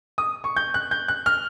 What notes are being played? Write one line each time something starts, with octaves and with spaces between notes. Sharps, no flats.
D#6
C#6
G6
F#6
G6
F#6
F6